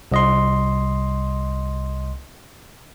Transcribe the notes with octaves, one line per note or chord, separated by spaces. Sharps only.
C2 D#5 C6